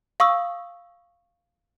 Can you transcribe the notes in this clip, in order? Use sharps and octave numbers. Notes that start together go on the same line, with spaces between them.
F5 C#6 D#6 E6